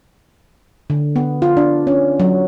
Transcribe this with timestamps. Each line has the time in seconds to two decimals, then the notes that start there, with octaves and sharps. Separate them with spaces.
0.90 D3
1.16 B3
1.42 F4
1.57 D4
1.87 C#4
2.20 F#3